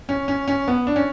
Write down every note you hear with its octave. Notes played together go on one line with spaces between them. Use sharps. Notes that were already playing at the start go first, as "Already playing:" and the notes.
C#4
C#4
C#4
B3
D4
C#4